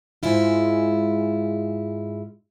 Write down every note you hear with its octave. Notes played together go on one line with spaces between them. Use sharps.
G#2 G#3 E4 F4